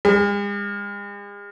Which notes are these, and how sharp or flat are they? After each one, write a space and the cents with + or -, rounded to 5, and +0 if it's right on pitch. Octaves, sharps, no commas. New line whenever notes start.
G#3 -45